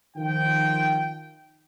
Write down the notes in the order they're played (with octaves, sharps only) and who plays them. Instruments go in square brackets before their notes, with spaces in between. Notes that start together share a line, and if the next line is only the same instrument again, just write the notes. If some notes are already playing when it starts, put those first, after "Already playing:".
[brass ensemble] D#3 F3 G5